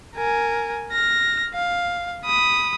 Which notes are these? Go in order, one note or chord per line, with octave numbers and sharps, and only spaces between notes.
A#4 G#5
F6 A#6
F5
B5 D#6